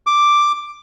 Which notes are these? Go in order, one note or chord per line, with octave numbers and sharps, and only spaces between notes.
D6